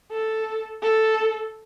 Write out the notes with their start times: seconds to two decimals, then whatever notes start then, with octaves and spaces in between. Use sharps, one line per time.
0.12 A4
0.83 A4